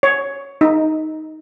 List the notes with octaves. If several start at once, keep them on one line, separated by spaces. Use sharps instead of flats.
C#5
D#4